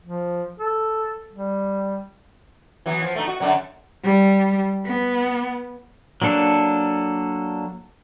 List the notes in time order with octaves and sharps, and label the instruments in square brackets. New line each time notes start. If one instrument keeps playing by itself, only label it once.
[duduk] F3
A4
G3
[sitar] E3 F#3 B3
F3
A3 D#4
F#4
F#2 D3 F#3
[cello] G3
B3
[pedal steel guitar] F#3 A#3 D4 A4